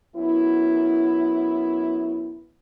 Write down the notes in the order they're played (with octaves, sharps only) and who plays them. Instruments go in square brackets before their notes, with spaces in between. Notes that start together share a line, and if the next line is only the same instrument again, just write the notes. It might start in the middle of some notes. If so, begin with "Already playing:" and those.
[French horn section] F#2 B3 E4